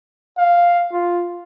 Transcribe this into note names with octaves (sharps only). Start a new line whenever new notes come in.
F5
F4